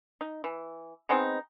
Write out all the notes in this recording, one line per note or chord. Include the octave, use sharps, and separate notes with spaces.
D#4
E3
G#3 B3 C4 D#4